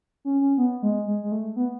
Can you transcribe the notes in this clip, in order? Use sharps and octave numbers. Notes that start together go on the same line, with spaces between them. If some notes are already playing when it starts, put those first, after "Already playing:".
C#4
C#4
B3
G#3
G#3
G#3
A3
B3